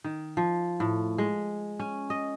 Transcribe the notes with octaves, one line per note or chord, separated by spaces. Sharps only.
D#3
F3
A2
G#3
C#4
D#5